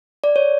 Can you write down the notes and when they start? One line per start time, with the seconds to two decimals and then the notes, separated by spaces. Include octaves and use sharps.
0.24 D5
0.36 C#5